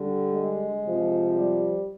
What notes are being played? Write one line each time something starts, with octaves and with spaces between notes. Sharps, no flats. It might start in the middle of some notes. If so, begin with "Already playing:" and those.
Already playing: D3 G3
G#3
C3 F3
G3